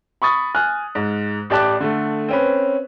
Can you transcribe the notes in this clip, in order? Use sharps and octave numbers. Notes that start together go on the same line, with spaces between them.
B5 C#6 D#6 A6
G#5 F6 F#6
G#2
A1 G4 D5 A5 F#6
D3 A3
C4 C#4 B4